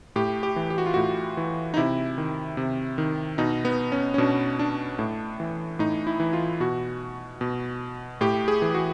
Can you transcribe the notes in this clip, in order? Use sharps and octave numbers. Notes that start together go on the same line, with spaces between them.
A2 G4
G4
E3
G4
F#4
F4
A2 F#4
E3
D#4
C3 E4
D#3
C3
D#3
B2 D#4
B3
C#4
C#4
B2 D4
D4
A2
E3
A2 D#4
E4
E3
F4
B2 F#4
B2
A2 G4
G#4
E3
F#4